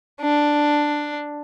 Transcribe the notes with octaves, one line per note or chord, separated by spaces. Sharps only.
D4